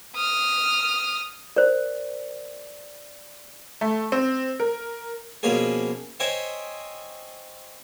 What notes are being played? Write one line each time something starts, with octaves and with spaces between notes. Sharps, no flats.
D#6 F6
A#4 C5 D5
A3
C4
A#4
B2 F3 A#3 C#4 G#4
C5 C#5 D#5 E5 G5 G#5